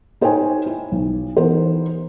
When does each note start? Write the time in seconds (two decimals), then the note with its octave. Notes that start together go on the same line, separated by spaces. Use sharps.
0.21 D#4 C5 C#5 G5 G#5
0.66 E4
0.92 B1
1.37 E3 B3 D#4 G4 A#4 C5